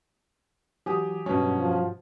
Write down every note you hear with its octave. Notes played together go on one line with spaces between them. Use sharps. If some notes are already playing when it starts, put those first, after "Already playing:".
E3 F#3 G4 G#5 D#6
G2 B2 F#3 C#4
F3